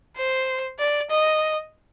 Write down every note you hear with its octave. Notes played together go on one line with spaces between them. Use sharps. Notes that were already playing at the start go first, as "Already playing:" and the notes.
C5
D5
D#5